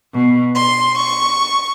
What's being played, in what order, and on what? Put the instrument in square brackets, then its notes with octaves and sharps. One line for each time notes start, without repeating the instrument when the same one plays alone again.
[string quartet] B2
C6
C#6